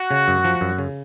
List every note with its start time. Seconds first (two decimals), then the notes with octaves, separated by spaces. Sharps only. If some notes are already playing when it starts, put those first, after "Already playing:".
Already playing: F#4
0.11 C#3
0.28 F#2
0.45 F3
0.61 F#2
0.79 C#3